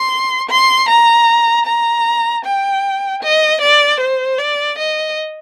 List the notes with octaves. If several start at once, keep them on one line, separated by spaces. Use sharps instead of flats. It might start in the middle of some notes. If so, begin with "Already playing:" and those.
Already playing: C6
C6
A#5
A#5
G5
D#5
D5
C5
D5
D#5